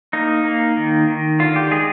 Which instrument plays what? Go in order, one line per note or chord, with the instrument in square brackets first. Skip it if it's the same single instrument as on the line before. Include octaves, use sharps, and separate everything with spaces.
[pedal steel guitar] A#3 D#4
A#3
D#3
D#3
D3 F4
G4
G#3 G#4